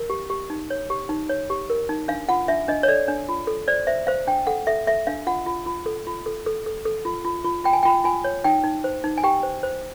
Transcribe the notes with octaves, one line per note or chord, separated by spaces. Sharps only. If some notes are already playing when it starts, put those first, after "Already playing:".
Already playing: A#4
G4
G4
D#4
C#5
G4
D#4
C#5
G4
A#4
D#4
D4 F5
F4 F#5
D4 E5
D4 D#5
C#5
A4 D5
D4
F4
A4
C5 D5
C5 E5
C5 F5
D4 G5
A4 F#5
A4 E5
A4 E5
D4 F5
F4 F#5
F4
F4
A4
F4
A4
A4
A4
A4
F4
F4
F4
F4 G5
G#5
G5
F4
F4 G#5
C#5
D#4 G5
D#4
C5
D#4
G#5
G4 G5
C5
C5